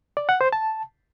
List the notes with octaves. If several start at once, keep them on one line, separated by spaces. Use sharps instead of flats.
D5
F#5
C5
A5